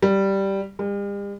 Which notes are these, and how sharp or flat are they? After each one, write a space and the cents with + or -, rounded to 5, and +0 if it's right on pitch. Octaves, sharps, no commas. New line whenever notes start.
G3 -5
G3 +45